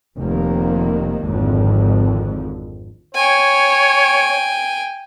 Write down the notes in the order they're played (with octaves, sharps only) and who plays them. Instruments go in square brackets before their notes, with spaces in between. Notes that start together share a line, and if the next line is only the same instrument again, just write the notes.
[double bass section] F1 C3 D#3 A#3
G#1 F2 D3
[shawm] C#5 [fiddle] G5 G#5